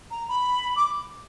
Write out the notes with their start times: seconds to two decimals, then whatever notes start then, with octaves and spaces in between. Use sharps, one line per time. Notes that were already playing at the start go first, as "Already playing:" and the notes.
0.11 A#5
0.29 B5
0.76 D6